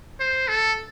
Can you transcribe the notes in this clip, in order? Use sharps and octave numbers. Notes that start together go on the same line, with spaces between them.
C5
A4